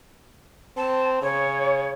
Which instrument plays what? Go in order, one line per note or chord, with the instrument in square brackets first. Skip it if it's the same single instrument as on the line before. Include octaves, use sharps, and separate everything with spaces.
[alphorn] C4 [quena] A5
[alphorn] C#3 [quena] C#5